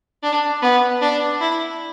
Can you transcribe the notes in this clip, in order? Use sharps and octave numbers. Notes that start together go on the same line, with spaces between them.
D4
B3
D4
E4